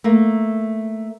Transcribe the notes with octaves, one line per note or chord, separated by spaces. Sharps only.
A3 A#3